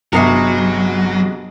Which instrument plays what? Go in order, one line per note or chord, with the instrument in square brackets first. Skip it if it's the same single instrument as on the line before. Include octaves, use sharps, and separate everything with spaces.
[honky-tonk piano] G1 C7 [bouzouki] C3 G#3 F#4 [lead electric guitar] F#3